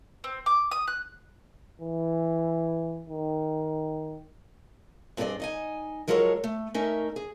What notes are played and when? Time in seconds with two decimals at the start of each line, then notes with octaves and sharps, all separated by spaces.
0.24 C4
0.46 D6
0.71 D#6
0.87 F#6
1.81 E3
3.09 D#3
5.17 G2 C4 G#4 A4 D5 D#5
5.40 D#4 D#5 G#5
6.08 F3 F#3 G#3 A4 A#4 C#5
6.44 A3
6.74 A3 C#4 D#4 A#4 D#5 E5
7.16 G#4